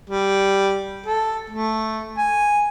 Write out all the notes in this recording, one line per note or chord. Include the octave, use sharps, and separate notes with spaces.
G3
A4
A3
G#5